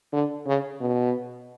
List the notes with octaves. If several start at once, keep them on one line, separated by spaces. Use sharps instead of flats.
D3
C#3
B2